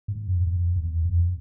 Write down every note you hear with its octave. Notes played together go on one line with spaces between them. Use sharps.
G#2
F2
F2
E2
F2